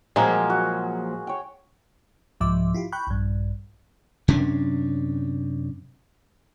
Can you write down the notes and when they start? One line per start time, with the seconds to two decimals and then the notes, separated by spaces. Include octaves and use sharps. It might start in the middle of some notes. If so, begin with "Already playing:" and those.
0.16 A#2 F3 F#3 G#3 A#3 C4 G#4
0.50 F#4
1.27 C#5 G5
2.40 C2 G#2 F3 E5 D6
2.74 E4 F4 G4
2.92 G5 B5 C#6 F#6 G6
3.07 A#1 G2
4.28 F#2 C3 C#4 D4